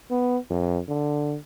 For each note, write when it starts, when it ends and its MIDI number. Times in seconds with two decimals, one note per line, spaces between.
0.11 0.37 59
0.50 0.80 41
0.89 1.36 50